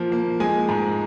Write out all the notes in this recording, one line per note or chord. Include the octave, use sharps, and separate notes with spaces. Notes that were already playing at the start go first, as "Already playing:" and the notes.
Already playing: F3 A#3
A#3
G#3 G#5
G#2